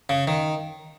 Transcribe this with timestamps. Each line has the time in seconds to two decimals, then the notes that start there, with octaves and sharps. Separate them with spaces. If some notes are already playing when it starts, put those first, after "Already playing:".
0.09 C#3
0.27 D#3